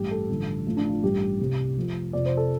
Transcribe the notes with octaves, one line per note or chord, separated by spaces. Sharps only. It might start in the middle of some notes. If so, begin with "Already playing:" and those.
Already playing: A1 G2 G3 G4
A4
A1 G2 D3 F3
A1 A2 F3
D4
F4
A1 G2 G3 G4
C2 C3 G3
F1 F2 C3 F3
F1 F2 C3 F3 D5
C5
A4